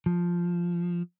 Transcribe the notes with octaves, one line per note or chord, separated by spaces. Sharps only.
F3